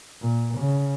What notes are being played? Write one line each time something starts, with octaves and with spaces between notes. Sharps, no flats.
A#2
C#3